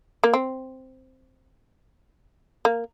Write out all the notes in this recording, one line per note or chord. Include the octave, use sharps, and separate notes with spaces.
A#3
C4
A#3